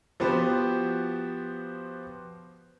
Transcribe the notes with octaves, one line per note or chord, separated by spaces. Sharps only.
F3 B3 F#4 G4 B4 C5